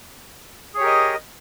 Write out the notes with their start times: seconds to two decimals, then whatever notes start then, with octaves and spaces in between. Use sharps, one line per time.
0.74 G#4
0.77 C#5
0.80 G4
0.83 A#4
0.86 D#5